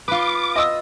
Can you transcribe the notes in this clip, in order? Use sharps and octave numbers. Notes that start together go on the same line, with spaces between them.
F4 B4 D6
D#5 D#6 E6